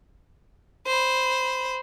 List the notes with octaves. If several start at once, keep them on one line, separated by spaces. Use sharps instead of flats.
C5 B5